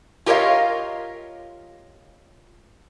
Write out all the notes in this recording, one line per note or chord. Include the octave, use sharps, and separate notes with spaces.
F4 G4 A#4 C#5 D#5 F5